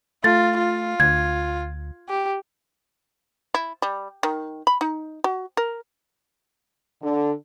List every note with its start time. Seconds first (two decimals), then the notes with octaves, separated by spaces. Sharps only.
0.24 A3 F4 A6
0.58 F4
1.00 D2 G#6
2.09 G4
3.54 E4
3.82 G3
4.23 D#3
4.67 B5
4.81 D#4
5.24 F#4
5.57 A#4
7.02 D3